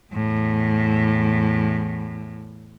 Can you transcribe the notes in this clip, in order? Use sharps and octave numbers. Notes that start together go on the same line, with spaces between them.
E2 A2